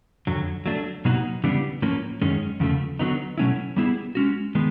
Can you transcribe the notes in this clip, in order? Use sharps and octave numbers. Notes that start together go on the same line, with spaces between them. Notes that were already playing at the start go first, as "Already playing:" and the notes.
F2 D3 F#3
F#3 A3 D4
B2 F#3 A#3 D#4 F#4
C#3 E3 G3 B3 D4
A2 F3 A#3 C#4
F#2 D#3 G#3 C#4
E2 C#3 F3 A3
D3 F#3 B3 D#4
B2 F#3 A3 C#4 E4
G3 B3 E4 G#4
G#3 C#4 F#4
D#3 G#3 B3